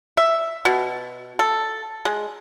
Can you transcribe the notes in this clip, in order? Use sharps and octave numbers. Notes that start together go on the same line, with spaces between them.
E5
B2
A4
G#3